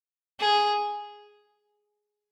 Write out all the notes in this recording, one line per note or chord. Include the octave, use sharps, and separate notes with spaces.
G#4